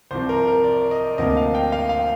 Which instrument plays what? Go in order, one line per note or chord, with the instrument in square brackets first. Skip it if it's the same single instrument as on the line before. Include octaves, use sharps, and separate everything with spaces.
[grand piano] C2 C3 F3 C5
A#4
A#4
D5
D#5
D2 C3 F3 A#3 D#5
F5
G5
F5
F5